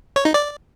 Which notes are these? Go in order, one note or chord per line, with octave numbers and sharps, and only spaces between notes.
C#5
D#4
D5